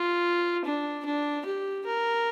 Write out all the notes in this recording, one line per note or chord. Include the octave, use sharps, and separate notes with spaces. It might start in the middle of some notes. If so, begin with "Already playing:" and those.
Already playing: F4
D4
D4
G4
A#4